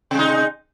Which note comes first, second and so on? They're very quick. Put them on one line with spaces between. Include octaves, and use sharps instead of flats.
C3 G#3 D#4